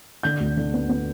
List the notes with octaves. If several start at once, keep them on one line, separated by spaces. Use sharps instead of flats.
D3 G6
D2
D3
B3
B3